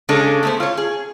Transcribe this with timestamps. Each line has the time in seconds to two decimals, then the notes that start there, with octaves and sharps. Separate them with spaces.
0.09 C#3 G#3 C#4 D4 A4
0.43 A3 B3 C5
0.60 F4 C#5
0.77 G#4